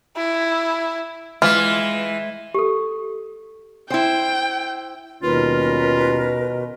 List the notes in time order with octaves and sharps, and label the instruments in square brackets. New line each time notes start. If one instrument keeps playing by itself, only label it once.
[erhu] E4
[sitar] E3 [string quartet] G#3 [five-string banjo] F4
[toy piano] G4 A4
[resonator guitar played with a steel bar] E4 C5 [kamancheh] G5
[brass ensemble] D#2 G3 C#4 [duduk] B2 [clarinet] F4 [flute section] A#4 B4